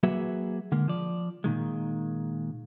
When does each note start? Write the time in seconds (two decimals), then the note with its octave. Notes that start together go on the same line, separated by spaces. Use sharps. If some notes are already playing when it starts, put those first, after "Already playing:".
0.03 F#3 A#3 F#4 G#4 B4 E5
0.72 D3 G#3 A#3
0.88 F3 D5
1.44 A#2 D#3 G#3